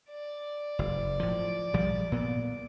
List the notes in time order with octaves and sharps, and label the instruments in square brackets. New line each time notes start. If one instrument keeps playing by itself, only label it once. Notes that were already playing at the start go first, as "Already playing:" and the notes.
[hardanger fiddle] D5
[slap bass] F#1
A2 F3
A#1 F3 G3
A#2 B3